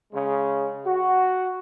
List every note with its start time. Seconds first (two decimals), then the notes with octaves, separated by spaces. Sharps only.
0.13 C#3 G#3
0.86 F#4